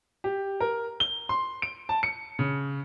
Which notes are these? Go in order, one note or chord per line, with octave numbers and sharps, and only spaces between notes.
G4
A#4
G7
C6
D7
A5
C#7
C#3